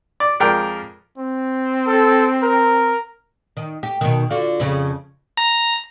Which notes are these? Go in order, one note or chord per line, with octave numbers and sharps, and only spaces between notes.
D5
F2 G#3 A#4 D5 G5 C6
C4
A4
A#4
D#3
G4
B2 D#3
D3 F4 F#4
F2 C#3
A#5